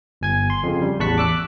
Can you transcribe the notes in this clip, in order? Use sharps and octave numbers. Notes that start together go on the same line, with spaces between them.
G1 G#5 G#6
C6
F2 C#3
G3
A1 E2 A5 C#6 F#6 B6
D6 E6 F#6